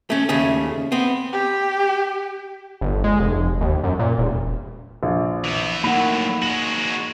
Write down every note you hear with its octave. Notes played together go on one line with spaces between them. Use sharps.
A3 C#4
D#2 C#3 A3 C#4 G#4
B3 C4
G4
G1
G#3
F1
D#2
F#2
A#2
E1
A#1
E3 B3
A2 F#3 A#3 D#4 F#5 B5
G#3 F#4 F#7